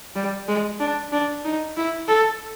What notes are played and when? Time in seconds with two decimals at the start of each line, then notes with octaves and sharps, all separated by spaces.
0.15 G3
0.48 G#3
0.79 D4
1.12 D4
1.45 D#4
1.77 E4
2.08 A4